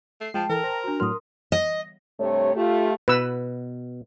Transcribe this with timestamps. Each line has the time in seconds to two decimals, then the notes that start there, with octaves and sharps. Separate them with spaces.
0.21 A3 C7
0.34 F3 G#3 G5 A5
0.50 E3 A4 A#4
0.64 C5 A#5
0.84 D4 F#4
1.00 A2 F#3 A#4 C6 D#6 F6
1.52 D#5
2.19 G2 C3 A3 C#5
2.55 A3 F4 G4
3.08 B2 B4 E6